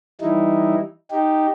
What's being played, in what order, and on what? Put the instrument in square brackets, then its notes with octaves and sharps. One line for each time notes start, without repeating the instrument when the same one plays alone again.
[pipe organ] E3 G3 D#4 E4
D#4 G4